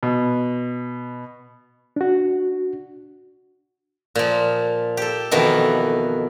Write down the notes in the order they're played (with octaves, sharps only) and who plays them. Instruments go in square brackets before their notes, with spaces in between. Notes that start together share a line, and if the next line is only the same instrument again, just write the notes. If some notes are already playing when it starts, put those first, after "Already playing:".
[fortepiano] B2
[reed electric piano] D4 F#4
[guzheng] A#2 F3
G4 A4
F2 B2 D#3 E3